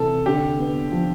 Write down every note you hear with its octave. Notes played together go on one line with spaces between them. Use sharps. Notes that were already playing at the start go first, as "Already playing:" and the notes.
Already playing: C3 E3 A4
D3 G4
B3
F3